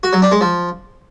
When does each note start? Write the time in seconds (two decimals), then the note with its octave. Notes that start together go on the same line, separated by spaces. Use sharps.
0.03 F#4
0.13 F#3
0.22 D4
0.32 G#3
0.41 F3